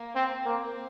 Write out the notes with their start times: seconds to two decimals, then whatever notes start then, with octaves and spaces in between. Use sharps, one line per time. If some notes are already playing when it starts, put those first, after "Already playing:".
Already playing: A#3
0.15 C4
0.46 A#3 C4